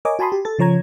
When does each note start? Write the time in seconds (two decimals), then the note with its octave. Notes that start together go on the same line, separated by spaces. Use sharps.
0.05 A#4 C#5 D#5 G#5 D6
0.19 F#4 G#5 A5 B5 C6 D#6
0.32 G4
0.45 A4 A6
0.59 C#3 F3 C#5 A#5 G#6